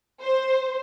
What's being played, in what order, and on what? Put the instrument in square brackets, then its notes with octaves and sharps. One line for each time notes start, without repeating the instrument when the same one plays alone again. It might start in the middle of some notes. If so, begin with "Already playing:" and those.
[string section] C5